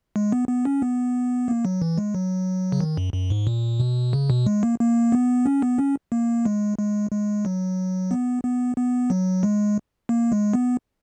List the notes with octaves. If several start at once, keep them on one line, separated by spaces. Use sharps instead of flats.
G#3
B3
B3
C#4
B3
A#3
F#3
E3
G#3
F#3
C#3
D#3
F#2
F#2
G#2
A#2
B2
C#3
B2
G#3
A#3
A#3
B3
C#4
B3
C#4
A#3
G#3
G#3
G#3
F#3
B3
B3
B3
F#3
G#3
A#3
G#3
B3